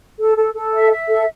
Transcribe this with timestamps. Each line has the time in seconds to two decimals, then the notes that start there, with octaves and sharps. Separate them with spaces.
0.18 A4
0.37 A4
0.55 A4
0.73 E5
0.91 E5
1.09 A4